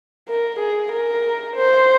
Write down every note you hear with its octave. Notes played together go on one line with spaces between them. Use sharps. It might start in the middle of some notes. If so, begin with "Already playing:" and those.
A#4
G#4
A#4
C5